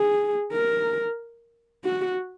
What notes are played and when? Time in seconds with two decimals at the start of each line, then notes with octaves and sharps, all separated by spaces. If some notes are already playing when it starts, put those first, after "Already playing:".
Already playing: G#4
0.52 A#4
1.84 F#4